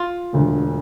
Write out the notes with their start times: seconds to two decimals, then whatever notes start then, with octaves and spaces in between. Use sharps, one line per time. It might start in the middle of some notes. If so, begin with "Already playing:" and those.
Already playing: F4
0.33 E1 D2 D3